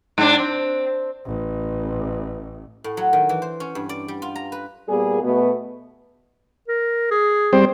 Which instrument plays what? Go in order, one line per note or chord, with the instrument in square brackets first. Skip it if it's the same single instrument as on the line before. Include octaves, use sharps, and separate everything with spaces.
[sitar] G#2 D4
C4
[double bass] A1
[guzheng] A2
F#3
D#3
E3
C5
C#4
G2
D5
G3
F4
A#5
B4
[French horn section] A#2 G3 A#3 B3 G#4
B2 A3 B3
[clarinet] A#4
G#4
[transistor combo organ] G3 C4 C5